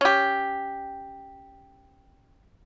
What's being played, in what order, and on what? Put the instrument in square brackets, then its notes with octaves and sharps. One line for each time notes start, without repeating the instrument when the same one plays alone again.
[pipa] C#4 G4